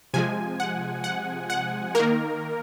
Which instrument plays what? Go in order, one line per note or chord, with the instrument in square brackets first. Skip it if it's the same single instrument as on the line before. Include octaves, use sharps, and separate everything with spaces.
[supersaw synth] C3 F3 G#3 G#5
F#5
F#5
F#5
D#3 A#3 A#4